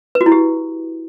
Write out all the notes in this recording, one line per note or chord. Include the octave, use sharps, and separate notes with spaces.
B4
F#4
E4
G4